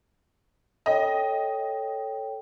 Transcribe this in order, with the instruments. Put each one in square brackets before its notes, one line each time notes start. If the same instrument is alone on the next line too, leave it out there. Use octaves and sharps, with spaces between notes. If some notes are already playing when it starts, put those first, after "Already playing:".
[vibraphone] A4 C#5 G5 [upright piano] D#5